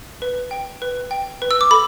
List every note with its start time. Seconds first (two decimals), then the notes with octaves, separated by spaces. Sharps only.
0.22 B4
0.51 G5
0.82 B4
1.11 G5
1.42 B4
1.51 E6
1.61 D6
1.71 A4 B5